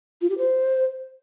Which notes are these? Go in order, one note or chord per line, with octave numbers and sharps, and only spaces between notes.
F4
G4
C5